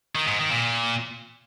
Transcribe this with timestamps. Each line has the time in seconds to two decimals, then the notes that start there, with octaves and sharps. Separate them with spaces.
0.16 D#3
0.27 G#2
0.39 D#3
0.51 A#2